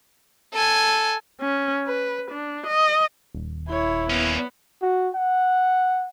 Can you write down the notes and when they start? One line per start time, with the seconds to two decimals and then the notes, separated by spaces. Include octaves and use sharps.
0.54 A4 G#5
1.41 C#4
1.88 B4
2.31 D4
2.67 D#5
3.34 D#1
3.70 E4 C#5
4.10 A#3 B3 C#4
4.82 F#4
5.15 F#5